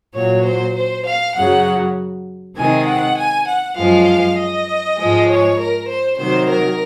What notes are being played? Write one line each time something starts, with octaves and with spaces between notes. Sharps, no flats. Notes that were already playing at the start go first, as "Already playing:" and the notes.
A#2 F#3 C#5
C5
C5
F5
F#2 C#3 F#3 F#5
C3 D#3 G#3 G#5
F#5
G#5
F#5
F#2 F3 G#3 F5
D#5
G#2 F3 G#3
C#5
A#4
C5
C3 D#3 F#3 C5
A#4